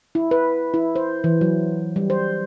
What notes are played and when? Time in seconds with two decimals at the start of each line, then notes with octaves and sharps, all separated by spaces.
0.15 E4
0.31 B4
0.74 E4
0.96 C5
1.24 E3
1.41 F#3
1.96 G3
2.10 C5